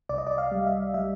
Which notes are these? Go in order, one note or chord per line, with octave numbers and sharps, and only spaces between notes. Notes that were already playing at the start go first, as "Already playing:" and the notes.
C2 D5
D#5
D5
F5
G3
E5
G3 E5